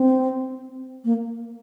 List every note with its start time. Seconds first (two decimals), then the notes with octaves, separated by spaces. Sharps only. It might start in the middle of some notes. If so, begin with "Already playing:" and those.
Already playing: C4
1.04 A#3